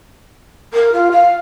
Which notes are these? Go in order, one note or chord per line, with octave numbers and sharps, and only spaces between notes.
A#4
F4
F5